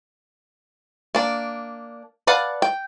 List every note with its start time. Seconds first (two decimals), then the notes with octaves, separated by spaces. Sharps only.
1.15 A#3 D4
2.27 B4 D5 F5 F#5 A5
2.62 G5